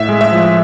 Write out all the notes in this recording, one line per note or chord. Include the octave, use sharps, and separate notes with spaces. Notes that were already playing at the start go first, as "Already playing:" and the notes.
Already playing: A2 E5
G#3
E5
F3